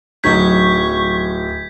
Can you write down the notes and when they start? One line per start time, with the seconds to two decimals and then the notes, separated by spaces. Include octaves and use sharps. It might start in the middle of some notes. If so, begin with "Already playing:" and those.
0.24 D1 F#3 D#4 C#6 G6 G#6 B6